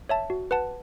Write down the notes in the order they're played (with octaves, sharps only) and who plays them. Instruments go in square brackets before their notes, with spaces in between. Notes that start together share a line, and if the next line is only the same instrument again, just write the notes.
[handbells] C#5 E5 A5
F#4
B4 F#5 A5